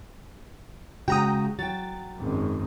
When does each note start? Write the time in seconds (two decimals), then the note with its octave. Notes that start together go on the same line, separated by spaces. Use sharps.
1.08 C#3 G#3 F#4 G5 A#5 D#6
1.59 F#3 G5 A6
2.18 G#1 F#2 G#3